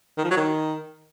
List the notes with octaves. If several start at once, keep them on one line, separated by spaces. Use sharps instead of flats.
D#3
F3
F#3
D#3